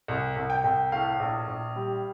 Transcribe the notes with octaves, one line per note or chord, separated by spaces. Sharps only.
C2
C2
G5
C2
A2 F5
A#1
A#1
G3